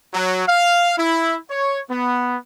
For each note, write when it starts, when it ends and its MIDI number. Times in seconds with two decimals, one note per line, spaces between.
0.14 0.43 54
0.47 0.97 77
0.98 1.35 64
1.50 1.79 73
1.90 2.36 59